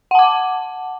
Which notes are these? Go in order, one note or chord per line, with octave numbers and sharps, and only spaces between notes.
F#5 A5 D6